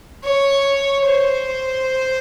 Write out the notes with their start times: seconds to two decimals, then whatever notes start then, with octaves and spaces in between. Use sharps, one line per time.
0.24 C#5
1.06 C5